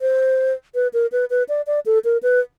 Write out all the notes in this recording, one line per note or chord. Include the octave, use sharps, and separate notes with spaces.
C5
B4
A#4
B4
B4
D5
D5
A4
A#4
B4